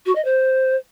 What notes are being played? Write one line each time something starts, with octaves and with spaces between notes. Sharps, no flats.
F#4
D#5
C5